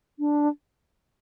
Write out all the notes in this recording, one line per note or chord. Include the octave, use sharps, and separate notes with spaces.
D4